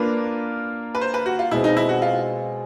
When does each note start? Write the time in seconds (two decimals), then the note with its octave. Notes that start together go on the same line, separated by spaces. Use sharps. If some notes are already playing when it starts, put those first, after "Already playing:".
Already playing: A#3 D4 F4 A#4 B4
0.95 B4
1.01 C5
1.14 B4
1.26 F#4
1.39 F4
1.51 B2 G#3 C4 E4
1.64 D#4
1.77 E4
1.89 F#4
2.02 F4